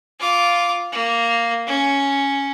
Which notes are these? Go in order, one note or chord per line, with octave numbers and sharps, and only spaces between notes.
F4 D6
A#3
C#4